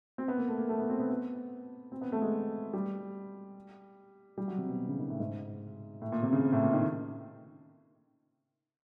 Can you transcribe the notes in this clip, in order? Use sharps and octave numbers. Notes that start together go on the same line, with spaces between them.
C4
B3
A#3
A3
A#3
A3
B3
C4
B3
B3
C4
B3
A3
G#3
G3
G3
F#3
C3
B2
C#3
D#3
A2
G#2
A2
A#2
C3
C#3
C3
A2
A#2
D#3